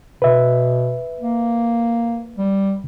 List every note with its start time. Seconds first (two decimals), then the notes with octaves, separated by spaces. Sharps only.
0.22 B2 B4 E5
1.20 A#3
2.37 G3